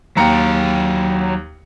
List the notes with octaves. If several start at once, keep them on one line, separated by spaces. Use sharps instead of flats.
D#2 F#3 G5 A#5 C#7